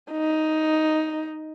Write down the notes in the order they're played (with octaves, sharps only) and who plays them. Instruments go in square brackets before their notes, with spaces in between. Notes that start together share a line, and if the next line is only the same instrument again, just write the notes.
[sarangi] D#4